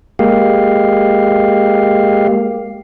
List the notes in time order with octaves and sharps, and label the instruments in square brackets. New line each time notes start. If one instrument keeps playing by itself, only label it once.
[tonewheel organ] G#3 A#3 G4 F5